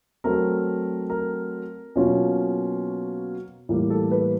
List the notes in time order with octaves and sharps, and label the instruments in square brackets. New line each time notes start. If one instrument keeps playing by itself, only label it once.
[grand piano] F#3 A3 C4 A#4
A#4
B2 F#3 A#3 C#4 F4
A2 E3 G3 A#3
A4
B4